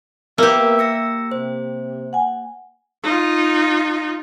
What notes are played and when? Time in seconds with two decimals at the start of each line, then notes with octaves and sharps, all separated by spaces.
0.38 A#3 B3 G4 A#4 B4 E5
0.79 E6 A#6 C#7
1.31 C3 C5
2.13 F#5 G#5
3.03 D#4 F4